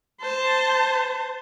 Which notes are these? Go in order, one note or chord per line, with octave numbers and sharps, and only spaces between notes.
C5 A5